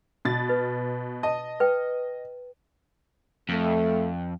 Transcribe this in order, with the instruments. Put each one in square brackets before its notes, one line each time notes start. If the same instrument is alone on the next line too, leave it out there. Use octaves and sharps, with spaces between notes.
[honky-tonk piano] B2 A6
[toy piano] B4
[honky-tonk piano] D#5 [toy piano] A5
[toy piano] B4 G5
[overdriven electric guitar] F2 [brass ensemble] A3